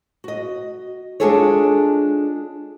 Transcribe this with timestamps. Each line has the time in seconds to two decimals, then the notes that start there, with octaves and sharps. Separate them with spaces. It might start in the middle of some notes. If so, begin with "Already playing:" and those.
0.24 F#4 D#5
1.20 G#3 D4 F4 G#4 A4 C#5